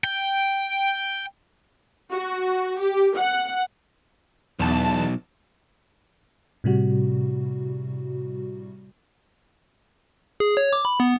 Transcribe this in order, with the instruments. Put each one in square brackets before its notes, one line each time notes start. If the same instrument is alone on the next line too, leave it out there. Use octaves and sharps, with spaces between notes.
[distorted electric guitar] G5
[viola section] F#4
G4
F#5
[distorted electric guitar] B1 [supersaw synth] E2 A5
[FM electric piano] A2 C3 G3 F#4
[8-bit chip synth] G#4
C#5
D6
B5
B3